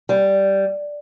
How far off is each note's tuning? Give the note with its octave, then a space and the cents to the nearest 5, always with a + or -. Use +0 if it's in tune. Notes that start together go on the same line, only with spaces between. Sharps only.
G3 -5